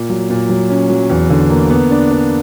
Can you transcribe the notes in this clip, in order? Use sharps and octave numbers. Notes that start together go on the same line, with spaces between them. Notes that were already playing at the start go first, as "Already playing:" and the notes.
Already playing: A#2
F#3
A#2
F#3
C#4
F#3
E2
D3
A#3
B3
D4
D4